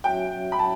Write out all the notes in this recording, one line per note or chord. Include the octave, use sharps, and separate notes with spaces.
F#3 C#4 F#4 C#5 E5 G5
B5
A5